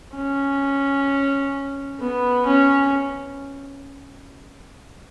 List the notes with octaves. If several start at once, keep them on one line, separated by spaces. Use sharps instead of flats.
C#4
B3
C#4